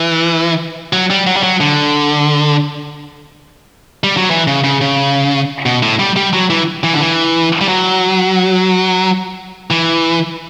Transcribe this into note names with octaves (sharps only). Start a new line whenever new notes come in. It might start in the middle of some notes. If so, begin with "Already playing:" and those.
Already playing: E3
F#3
G3
F#3
G3
F#3
D3
G3
F#3
E3
C#3
C#3
C#3
B2
A2
G3
G3
F#3
E3
E3
D3
E3
G3
F#3
E3